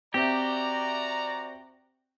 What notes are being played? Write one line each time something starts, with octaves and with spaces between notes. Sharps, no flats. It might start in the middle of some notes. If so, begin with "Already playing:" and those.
C4 F#4 G4 D5 E5 A#5